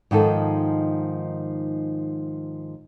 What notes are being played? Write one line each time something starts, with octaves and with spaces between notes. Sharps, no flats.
G#2 D#3 F3 A4